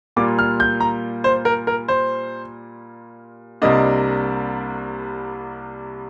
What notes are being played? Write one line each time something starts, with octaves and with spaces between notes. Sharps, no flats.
A#2 G3 A#3 F4 D6
F6
G6
A#5
C5
A#4
A#4
C5
C2 C3 G3 A#3 D4 D#5